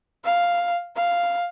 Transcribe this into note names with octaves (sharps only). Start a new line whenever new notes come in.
F5
F5